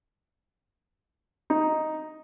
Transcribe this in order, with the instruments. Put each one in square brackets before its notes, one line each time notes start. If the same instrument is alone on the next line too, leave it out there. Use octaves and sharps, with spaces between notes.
[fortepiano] D#4